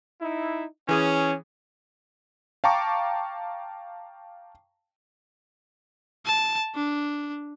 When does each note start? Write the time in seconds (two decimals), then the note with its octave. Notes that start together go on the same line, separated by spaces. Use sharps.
0.21 D#4 E4
0.89 E3 C#4 G#4 D#6
2.64 F5 G5 A5 A#5 C#6 D6
6.26 A5
6.75 D4